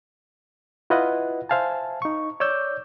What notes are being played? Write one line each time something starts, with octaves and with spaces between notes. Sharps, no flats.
E4 F4 B4 D#5 E5 F#5
C5 E5 F5 G#5 A5
D#4 C#6
C#5 D5 D6 E6 G6